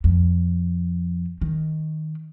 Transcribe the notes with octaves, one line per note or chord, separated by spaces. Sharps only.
F2
D#3